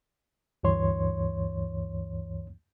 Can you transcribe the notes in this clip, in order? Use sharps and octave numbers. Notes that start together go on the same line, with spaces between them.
D2 G2 E3 C#5 C6